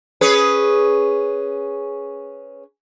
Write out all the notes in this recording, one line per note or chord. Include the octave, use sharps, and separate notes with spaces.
C#4 G#4 B4